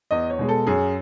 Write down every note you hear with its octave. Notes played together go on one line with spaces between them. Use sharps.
E2 D#5
C#5
B2 G#3
A4
F#2 G#4